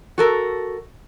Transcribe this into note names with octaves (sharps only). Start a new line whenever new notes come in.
F#4 A4 A#4